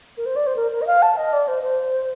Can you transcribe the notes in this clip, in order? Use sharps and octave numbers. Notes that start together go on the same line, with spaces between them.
A#4
C5
D5
C5
A#4
A#4
D#5
F5
A5
D#5
D5
C5
C5